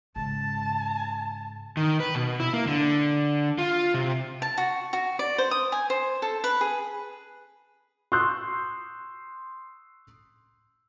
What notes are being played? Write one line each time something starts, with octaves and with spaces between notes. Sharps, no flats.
G#2 C#3 A5
D#3
B4
B2
E4
A#3
D3
F4
C3
A5
F#4
F#4
D5
C5
D#6
G#5
C5
A4
B4
G#4
C6 C#6 D#6 E6 F#6 G6